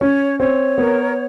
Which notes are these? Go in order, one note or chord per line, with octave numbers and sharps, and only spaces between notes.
C#4 C#5
C4 C#5
B3 A#4